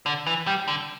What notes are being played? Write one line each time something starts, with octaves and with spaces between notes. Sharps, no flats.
D3
E3
G3
D3